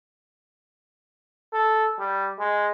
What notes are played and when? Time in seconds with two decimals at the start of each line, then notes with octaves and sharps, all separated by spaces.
1.53 A4
1.99 G3
2.39 G#3